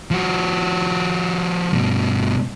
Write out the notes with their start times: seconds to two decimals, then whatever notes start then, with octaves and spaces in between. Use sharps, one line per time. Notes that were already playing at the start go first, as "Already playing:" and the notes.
0.11 F3 F#4
1.73 G2 B2